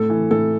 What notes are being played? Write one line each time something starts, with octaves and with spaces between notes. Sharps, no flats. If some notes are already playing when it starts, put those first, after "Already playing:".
Already playing: A2 A4
E3
A2 A4